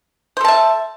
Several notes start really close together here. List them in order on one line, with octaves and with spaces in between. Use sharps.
C5 A4 A5 E5